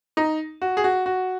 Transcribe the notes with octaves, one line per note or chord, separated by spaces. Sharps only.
D#4
F#4
G#4
F#4
F#4